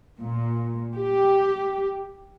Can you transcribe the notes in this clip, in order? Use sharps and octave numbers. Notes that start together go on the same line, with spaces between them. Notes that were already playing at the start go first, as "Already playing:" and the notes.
A#2
G4